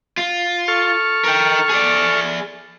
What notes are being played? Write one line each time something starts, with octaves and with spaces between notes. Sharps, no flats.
F4
A4 C#6 F6
A#4 G5
G#4 D5